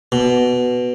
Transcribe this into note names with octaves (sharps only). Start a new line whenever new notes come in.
B2